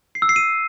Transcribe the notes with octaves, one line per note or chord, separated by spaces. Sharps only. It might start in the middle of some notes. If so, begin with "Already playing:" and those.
C7
E6
C7
D#7